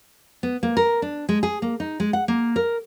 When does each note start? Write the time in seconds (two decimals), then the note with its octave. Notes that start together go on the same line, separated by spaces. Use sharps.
0.43 B3
0.63 A#3
0.77 A#4
1.02 D4
1.29 G#3
1.43 G#4
1.62 A#3
1.80 D#4
2.00 G#3
2.13 F#5
2.28 A#3
2.56 A#4